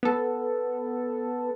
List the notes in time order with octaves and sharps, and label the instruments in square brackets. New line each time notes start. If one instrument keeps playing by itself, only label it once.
[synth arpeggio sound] B3 A4